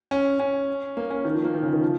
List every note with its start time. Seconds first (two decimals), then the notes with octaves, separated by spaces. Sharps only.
0.11 C#4
0.40 C#4
0.97 A#3
1.10 C#4
1.25 D#3
1.34 F3
1.44 A#3
1.54 D#3
1.63 C#3
1.73 D#3
1.82 F3